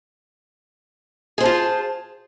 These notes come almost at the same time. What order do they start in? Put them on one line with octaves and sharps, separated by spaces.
G#4 C5 A5 F4